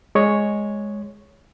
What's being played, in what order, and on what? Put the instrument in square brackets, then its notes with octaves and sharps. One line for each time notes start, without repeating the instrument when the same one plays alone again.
[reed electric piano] G#3 C#5